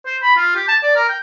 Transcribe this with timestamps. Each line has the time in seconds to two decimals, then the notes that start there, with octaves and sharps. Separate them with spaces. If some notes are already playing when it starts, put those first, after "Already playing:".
0.06 C5
0.22 B5
0.36 F4
0.56 G4
0.68 A5
0.83 D5
0.96 A#4
1.09 G5